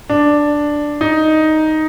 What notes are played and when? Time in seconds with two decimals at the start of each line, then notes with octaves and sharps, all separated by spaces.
0.10 D4
1.01 D#4